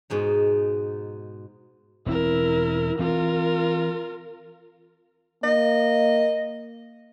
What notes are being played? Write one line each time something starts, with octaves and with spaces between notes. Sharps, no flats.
G#2 B2 D#4
E1 C4 E4 A#4
E3 C4 F4 A#4
A#3 D#5